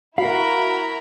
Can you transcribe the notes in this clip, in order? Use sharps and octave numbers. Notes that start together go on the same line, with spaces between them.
E4 F#4 A#4 F5 A#5 B5